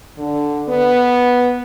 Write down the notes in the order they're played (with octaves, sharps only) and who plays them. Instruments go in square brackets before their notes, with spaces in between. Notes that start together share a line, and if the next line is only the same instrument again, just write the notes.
[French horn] D3
B3